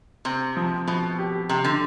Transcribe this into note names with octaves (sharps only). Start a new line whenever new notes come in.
C3 C4
F3
B2 F3
G4
C3 G4
D3